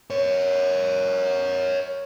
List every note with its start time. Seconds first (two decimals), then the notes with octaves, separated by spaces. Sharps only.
0.10 A#4 C#5